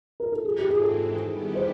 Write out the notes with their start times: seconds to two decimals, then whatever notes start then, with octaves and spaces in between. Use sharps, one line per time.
0.20 A#4
0.32 A4
0.45 G#2 E3 G#3 C4 G#4
0.58 G4
0.70 G#4
0.82 A4
1.18 D#3 G3 B3 E4 G4
1.55 C5